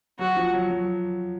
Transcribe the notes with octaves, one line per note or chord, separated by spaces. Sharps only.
F#3 F#4
F3
F#3
F#3